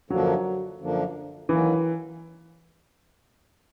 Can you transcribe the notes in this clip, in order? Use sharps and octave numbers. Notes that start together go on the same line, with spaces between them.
F#2 D3 F3 F#3 A#3 D4
F#2 D3 F3 A#3 D4
D#3 E3 F#3 A#3 C#4